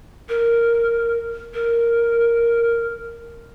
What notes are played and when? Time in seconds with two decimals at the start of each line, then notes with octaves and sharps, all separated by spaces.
0.29 A#4
1.54 A#4